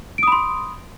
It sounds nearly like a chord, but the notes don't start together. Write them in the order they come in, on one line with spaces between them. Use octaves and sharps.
D7 D#6 B5 C6